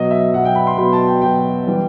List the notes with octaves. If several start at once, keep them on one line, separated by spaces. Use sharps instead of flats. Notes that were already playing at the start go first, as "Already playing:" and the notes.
Already playing: B2 F#3 B3 D#5
E5
B2 F#3 B3 F#5
G5
B5
C6
B2 F#3 B3 B5
A5
G5
B2 F#3 B3 G5
E3 G3 B3